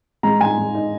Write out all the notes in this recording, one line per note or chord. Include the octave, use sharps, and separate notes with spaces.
G#3 A#5
G#3 G#5
G#3
D#4